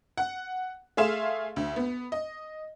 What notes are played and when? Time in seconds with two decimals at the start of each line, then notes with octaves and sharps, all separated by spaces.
0.17 F#5
0.97 A3 G#4 E5 F5 C6 E7
1.56 D2
1.76 B3
2.12 D#5